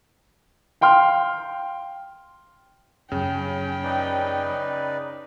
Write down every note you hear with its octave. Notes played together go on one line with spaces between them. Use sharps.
F5 G5 C6 F6
F#2 C#3 C#4 G5
D#4 B4 D5